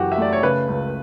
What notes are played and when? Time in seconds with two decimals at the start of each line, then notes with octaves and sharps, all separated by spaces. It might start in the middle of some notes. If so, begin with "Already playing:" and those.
Already playing: F#1 F#2 E3 F#4 G4
0.12 E5
0.18 A3 D5
0.33 C#5
0.43 C#3 B4
0.68 C#2